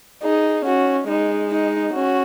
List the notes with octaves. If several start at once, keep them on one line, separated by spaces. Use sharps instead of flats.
D#4 G#4
C#4 F#4
G#3 D#4
D#4
C#4 F#4